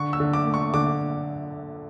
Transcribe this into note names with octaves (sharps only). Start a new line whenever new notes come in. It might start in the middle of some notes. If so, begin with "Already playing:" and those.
Already playing: D3 C#6
E6
D3
D6
A3
C#6
D3 D6